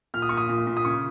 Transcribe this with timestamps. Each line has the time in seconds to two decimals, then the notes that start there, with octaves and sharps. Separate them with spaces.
0.14 A#2 F6
0.22 D#6
0.29 C#6
0.32 A#2
0.37 D#6
0.49 A#2
0.67 A#2
0.77 D#6
0.85 C#3 C#6